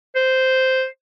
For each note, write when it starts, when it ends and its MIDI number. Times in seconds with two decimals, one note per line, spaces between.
0.16 0.86 72